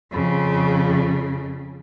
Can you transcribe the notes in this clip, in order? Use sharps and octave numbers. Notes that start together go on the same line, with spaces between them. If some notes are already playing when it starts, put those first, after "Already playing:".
F2 C#3